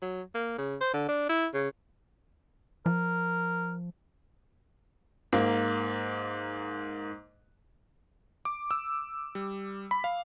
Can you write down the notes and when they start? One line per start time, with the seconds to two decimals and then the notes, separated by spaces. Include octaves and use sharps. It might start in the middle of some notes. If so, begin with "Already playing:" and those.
0.02 F#3
0.35 A#3
0.58 C#3
0.81 C5
0.94 D3
1.09 D4
1.29 E4
1.54 C#3
2.86 F3 A#4
5.33 G#2 A#3
8.45 D6
8.71 E6
9.35 G3
9.91 B5
10.04 F5